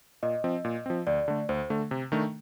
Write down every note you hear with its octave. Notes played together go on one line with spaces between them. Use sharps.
A#2 D#5
F3 C4
A#2
F3 C4
D2 D5
D3 A3
D2 C5
D3 A3
C3
D#3 A3 D4